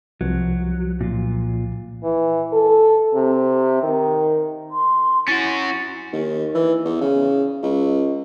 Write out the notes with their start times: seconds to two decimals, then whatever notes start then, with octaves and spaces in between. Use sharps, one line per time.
0.21 C2 F3 F#3
1.01 A#2 F4
2.03 E3
2.53 A4
3.14 C3
3.83 D#3
4.71 C6
5.28 C#4 E4 F#4 A6
6.12 D#2
6.54 E3
6.85 E2
7.01 C#3
7.62 C#2